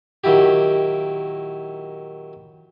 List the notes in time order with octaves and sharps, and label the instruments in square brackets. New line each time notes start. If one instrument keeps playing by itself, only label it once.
[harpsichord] A#2 D#3 F#3 E4 G4